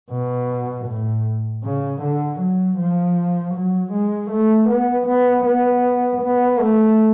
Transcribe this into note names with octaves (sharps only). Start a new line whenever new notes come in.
B2
A2
C#3
D3
F#3
F3
F#3
G#3
A3
B3
B3
B3
B3
A3